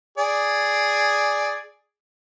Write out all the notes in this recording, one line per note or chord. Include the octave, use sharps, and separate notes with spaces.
G#4 D5